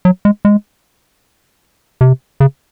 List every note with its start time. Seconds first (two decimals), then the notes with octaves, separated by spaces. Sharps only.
0.05 F#3
0.25 G#3
0.45 G#3
2.01 C3
2.40 C#3